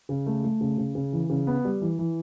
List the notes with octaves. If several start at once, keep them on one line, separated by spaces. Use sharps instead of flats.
C#3
A3
A3
C#3
C#3
C#3
E3
C#3
B3
G3
E3
E3